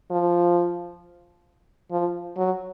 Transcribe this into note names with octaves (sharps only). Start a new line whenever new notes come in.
F3
F3
F#3